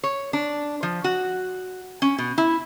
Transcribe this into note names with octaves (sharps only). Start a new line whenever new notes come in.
C#5
D4
F3
F#4
C#4
B2
E4